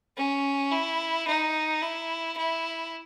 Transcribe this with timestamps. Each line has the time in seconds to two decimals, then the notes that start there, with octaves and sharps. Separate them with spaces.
0.17 C#4
0.72 E4
1.28 D#4
1.82 E4
2.37 E4